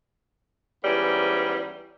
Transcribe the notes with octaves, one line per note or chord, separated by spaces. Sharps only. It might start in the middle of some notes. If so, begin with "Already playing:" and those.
G#2 E3 G3 B3 C#4